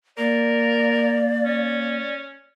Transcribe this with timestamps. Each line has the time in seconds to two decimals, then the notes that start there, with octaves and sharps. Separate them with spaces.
0.18 A#3 A#4 D5
1.45 C#4